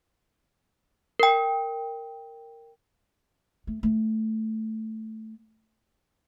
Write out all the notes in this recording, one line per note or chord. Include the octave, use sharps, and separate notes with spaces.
A#4 G5
A3
A3